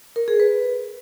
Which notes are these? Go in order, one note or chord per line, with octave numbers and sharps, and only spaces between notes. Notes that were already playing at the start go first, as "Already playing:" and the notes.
A#4
G#4
B4